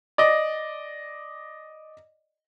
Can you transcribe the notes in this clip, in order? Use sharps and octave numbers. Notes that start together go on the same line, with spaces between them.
D5 D#5